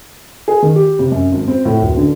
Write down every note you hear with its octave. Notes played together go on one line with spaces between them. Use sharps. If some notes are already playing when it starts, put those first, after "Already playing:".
G#4
D#3
G4
C3
F#2
G#1
C4
A2
D1
D3